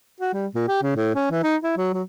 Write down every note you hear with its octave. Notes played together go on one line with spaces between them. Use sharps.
F#4
G3
A#2
G4
C#3
A2
C#4
E3
D#4
E4
F#3
F#3